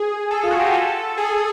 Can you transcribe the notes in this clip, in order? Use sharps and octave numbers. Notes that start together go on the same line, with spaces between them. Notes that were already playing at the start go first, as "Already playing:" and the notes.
Already playing: G#4
A4
F4
F#4
G4
G#4
A4
G#4